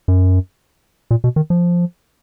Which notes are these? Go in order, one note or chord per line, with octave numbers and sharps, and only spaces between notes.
F#2
A#2
B2
D#3
F3